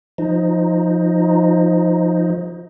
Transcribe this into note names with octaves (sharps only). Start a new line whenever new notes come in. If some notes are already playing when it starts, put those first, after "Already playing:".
F3 D#4